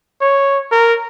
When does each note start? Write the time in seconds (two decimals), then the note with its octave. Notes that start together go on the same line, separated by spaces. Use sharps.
0.21 C#5
0.71 A#4